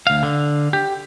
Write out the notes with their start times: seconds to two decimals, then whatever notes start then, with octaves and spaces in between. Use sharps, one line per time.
0.07 D2 F5
0.23 D3
0.73 G4